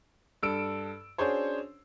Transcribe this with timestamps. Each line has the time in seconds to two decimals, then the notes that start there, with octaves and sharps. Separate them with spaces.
0.43 G2 A4 E6 D7
1.18 C#4 D4 F#4 G#4 C5 C#5